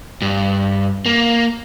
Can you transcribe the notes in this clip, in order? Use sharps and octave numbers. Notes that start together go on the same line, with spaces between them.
G2
A#3